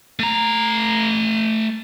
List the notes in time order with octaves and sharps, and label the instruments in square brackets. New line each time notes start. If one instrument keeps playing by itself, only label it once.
[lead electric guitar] A3 A#5